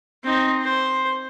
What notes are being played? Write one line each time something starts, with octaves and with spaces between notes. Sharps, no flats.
C4 D#4
C5